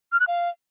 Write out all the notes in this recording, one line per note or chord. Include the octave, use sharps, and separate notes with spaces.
F6
F#6
F5